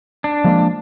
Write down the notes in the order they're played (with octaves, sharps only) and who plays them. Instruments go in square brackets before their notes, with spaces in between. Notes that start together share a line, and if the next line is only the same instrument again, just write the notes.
[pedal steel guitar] D4
[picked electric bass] F3 G#3 A#3